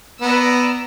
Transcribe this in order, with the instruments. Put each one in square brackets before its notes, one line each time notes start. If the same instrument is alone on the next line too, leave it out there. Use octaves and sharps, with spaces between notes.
[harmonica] B3 [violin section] D5 A#5 E6